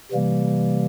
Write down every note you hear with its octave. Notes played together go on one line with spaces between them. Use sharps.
C3 E3 G3 A#3